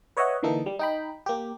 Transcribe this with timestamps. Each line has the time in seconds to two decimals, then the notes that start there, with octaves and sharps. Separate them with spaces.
0.17 B4 C#5 D#5 E5 F#5
0.43 D3 E3 A#3 D#4 A4
0.66 G3
0.79 D#4 G5 B5
1.26 A#3 G4